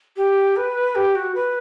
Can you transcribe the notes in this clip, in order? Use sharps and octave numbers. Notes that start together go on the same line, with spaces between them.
G4
B4
G4
F#4
B4